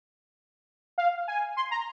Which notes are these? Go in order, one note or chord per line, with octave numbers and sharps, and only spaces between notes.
F5
G#5
C6
A#5